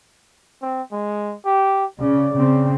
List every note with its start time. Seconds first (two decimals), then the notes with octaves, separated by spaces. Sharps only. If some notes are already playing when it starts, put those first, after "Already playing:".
0.62 C4
0.92 G#3
1.45 G4
2.00 C#3 D5
2.36 C#3 C4